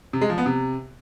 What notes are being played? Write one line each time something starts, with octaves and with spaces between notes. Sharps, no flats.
C3
G#3
F3
B3
C3